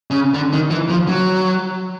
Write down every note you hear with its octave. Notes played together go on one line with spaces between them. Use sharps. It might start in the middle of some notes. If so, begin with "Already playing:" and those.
C#3
D3
D#3
E3
F3
F#3